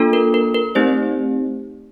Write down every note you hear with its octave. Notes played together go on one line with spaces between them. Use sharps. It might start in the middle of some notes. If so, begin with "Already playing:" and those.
Already playing: A#3 D4 F4 A4
A#4
A#4
A#4
A3 C4 D#4 G4 C5